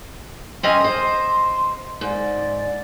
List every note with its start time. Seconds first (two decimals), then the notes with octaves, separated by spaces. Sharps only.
0.63 C4 C#4 D#5 C6
0.80 C5 D#5
2.01 G#2 D5